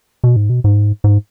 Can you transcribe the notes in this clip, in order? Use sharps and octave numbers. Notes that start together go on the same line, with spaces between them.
B2
G#2
B2
G#2
G#2